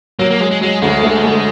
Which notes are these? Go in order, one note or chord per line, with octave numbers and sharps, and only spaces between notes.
F#3 A#3
A#3
F#3 G#3
G#3
F#3 G#3
D2 G#3
A3
A3